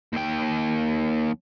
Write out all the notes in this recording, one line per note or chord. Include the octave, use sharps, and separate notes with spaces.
D#2 G5